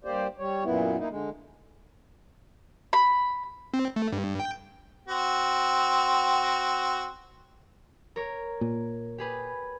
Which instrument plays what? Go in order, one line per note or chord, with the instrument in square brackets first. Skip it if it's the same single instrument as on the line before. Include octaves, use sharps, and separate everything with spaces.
[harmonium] G2 A#3 G4 C5 D5
G3 C#5
F#2 A#2 B3 E4
A#3 D#4 E4
D3 G#3
[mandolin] B5
[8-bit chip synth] C4
A3
G2
G5
[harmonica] C4 F#4
[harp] A#4 C#5
[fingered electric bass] A#2
[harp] G4 G#4 B4